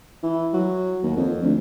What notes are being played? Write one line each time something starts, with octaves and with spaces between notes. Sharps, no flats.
E3
F#3
D#2
F2
D2